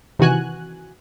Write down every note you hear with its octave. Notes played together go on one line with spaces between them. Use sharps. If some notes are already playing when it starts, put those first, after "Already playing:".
C3 D#3 E3 F#4 G#5 F#6